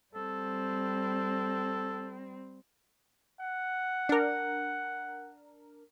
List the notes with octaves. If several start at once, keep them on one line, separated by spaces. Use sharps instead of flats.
G3 C4 A4
F#5
D4 A#4